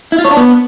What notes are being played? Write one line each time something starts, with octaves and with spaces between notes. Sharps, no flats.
E4
F4
C#5
D4
B3